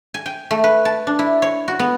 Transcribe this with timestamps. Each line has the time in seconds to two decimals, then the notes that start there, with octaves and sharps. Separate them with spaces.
0.14 G#5
0.26 G5
0.51 A3
0.64 B4
0.85 A5
1.07 D4
1.19 E4
1.42 C#5
1.68 F#4
1.79 B3